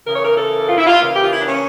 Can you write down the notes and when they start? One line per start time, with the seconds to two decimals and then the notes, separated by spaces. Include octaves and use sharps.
0.07 C#3 E3 A#3 A#4
0.15 C#5
0.25 A#4
0.38 A4
0.69 F4
0.78 E4
0.87 F4
1.01 C#3 E3 A#3
1.14 G4
1.22 F4
1.31 E4
1.40 D4
1.49 C#4